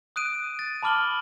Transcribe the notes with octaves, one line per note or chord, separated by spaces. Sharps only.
D#6 F#6 D7 D#7
A6
A5 B5 D6 F6 F#7 G7